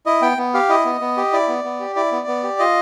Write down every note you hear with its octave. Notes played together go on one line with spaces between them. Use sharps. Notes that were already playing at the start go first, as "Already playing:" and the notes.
E4 D#5
B3 G5
B3
G4 F5
E4 D#5
B3
B3
G4
E4 D5
B3
B3
G4
E4 D5
B3
B3
G4
F4 D#5